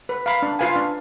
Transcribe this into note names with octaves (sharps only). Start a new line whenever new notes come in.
B4
F5 B5
D4
F4 B4 F5 G#5
D4